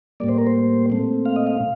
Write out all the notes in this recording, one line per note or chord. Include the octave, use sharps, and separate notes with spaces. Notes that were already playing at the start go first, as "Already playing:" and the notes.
A2 G3 A#3 D5
C5
A#4
C5
A#2 A3 C4
F5
D#5
F5